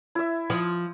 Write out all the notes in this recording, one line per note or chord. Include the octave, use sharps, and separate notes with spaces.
E4 E5
F3 D#6